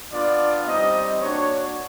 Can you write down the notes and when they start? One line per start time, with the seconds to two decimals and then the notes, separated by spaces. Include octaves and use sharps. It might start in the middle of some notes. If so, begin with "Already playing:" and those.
0.11 B3 D4 F4 D5
0.65 G3 C4 D#4 D#5
1.21 A#3 D4 F#4 C#5